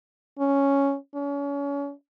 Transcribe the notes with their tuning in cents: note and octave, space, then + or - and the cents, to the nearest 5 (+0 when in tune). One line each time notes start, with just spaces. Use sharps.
C#4 +0
C#4 +35